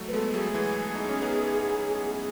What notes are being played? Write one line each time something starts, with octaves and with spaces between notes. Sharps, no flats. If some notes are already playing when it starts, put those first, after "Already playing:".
Already playing: F#3 A3
B4
G#3 B3 A4
F#3 A3 G#4
F#3
E3 G#3
D#4
C#4
B3 D#4